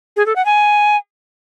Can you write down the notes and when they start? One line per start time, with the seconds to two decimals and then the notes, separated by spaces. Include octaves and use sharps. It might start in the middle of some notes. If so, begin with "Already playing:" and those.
0.16 G#4
0.26 A4
0.36 F#5
0.45 G#5